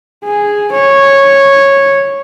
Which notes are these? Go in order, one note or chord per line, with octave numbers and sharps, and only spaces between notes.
G#4
C#5